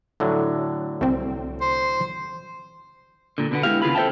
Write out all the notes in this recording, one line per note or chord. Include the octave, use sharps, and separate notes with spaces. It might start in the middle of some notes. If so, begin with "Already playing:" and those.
A2 D3 F#3
C2 C4
C5
A#2 D3
B2 D3 B3
G#3 B3 E4 G4 F5
D#2 C#3 F4 G#4 B4 B5
A4 C5 D5 E5 G5 A5